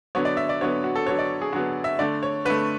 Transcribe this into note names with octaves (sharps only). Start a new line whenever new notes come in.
D3 F#3 B3 C#5
D5
E5
D5
D3 F#3 B3 C#5
F#4
A4
D3 F#3 B3 C#5
D5
G#4
D3 F#3 B3 F#4
E5
D3 A3 D5
C#5
D3 A3 B4